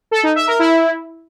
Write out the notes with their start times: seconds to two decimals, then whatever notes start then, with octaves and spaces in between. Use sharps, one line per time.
0.11 A4
0.23 D#4
0.35 E5
0.47 A#4
0.59 E4